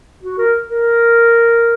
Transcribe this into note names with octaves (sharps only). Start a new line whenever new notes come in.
F#4
A#4
A#4